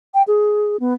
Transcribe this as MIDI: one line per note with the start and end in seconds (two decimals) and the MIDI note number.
0.14 0.22 79
0.27 0.77 68
0.80 0.94 59